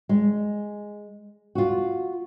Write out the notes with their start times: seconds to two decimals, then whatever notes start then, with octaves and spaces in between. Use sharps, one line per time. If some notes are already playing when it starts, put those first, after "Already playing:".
0.09 G#3
1.55 F4 F#4